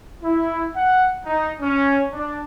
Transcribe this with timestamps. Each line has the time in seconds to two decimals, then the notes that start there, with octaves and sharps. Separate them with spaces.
0.22 E4
0.75 F#5
1.25 D#4
1.61 C#4
2.13 D4